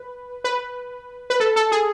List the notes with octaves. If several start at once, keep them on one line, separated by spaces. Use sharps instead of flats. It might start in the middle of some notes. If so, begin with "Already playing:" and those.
Already playing: B4
B4
B4
A4
A4
G#4